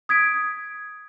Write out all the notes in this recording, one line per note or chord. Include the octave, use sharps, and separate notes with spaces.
D#6 G#6 B6 D7